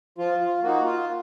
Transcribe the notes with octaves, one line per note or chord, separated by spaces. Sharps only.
F3 F4
F4
A#3 D#4 F#4
F4